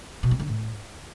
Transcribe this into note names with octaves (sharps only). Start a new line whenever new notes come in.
B2
C4
D3
A2